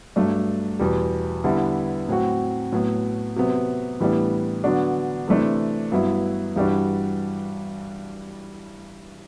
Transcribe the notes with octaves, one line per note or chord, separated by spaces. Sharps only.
G2 F#3 A3 D4
E2 B2 G3
D3 G3 B3 E4
A2 F#3 C4 F#4
A2 F#3 B3
C3 F#3 B3
A2 E3 G3 B3 D4
D3 F#3 B3 D4 F#4
C3 E3 A3 D4
G2 F#3 B3 E4
G2 E3 G3 D4 F#4